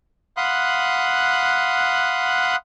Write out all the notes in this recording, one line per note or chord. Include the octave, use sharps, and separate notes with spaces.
F5 F#5 B5 C6 D#6 F#6